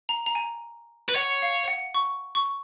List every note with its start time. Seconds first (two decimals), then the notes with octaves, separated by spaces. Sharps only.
0.09 A#5
0.26 A#5
0.35 G#5
1.09 B4
1.15 C#5 F#5
1.42 F5
1.68 F#5
1.94 C#6
2.35 C#6